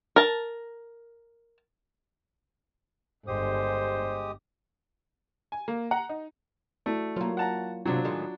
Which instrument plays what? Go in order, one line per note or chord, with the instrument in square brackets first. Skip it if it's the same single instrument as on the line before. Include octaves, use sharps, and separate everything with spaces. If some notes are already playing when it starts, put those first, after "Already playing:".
[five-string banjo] A#4 A5
[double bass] G1 [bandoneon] G#3 G4 D#6 [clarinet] C5
[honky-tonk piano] G#5
A#3
F#5 A#5
D#4
[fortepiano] A3 [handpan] E4 F#4 D5
[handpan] F#3 C#5 [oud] A#3 F4
[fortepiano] F#5 A5 A#5
[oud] D#2 G#2 C3 [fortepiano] F#3 D4 [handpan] F4
[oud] A2 D#3 G#3